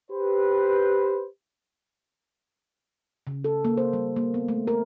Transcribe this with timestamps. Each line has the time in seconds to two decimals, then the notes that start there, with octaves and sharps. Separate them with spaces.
0.11 G4 B4 C5
3.27 C#3
3.44 A4
3.65 A#3
3.78 C5
3.93 G3
4.16 A#3
4.34 B3
4.48 A3
4.67 A#4